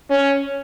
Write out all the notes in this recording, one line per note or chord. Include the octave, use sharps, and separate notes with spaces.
C#4